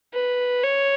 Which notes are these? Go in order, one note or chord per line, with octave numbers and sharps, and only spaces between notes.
B4
C#5